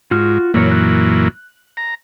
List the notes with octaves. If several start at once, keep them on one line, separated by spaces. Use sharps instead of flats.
G#2 F4 F#4 F6
F#2 A#2 E3 A#3 A#4 C#5
F#6
A#5